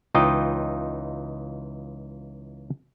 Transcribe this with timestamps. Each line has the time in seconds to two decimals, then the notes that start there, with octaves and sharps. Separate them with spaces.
0.14 C#2 E3 D#4 F4 D#5 G5